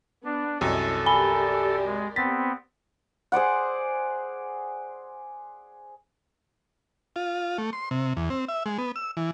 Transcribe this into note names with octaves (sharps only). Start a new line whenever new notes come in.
B3 D4
C2 F#2 E4 A4 C#5 D#5
G4 A#4 D5 G#5 B5 G7
G#3
B3 C4 A6 B6
G#4 C5 D5 F#5
F4
A3
C6
C3
E2
C4
E5
G#3
B3
E6
E3